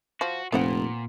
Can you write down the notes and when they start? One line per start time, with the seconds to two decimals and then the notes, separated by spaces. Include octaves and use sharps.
0.21 F3 F#4
0.52 F1 A#2 B3 C4 F#5